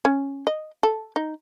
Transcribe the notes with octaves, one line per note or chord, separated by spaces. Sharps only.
C#4
D#5
A4
D#4